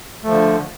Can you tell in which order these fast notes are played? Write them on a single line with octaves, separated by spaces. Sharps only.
A3 F3 D3